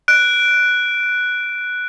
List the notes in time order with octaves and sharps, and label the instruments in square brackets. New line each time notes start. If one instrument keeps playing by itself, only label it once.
[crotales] F#6 D7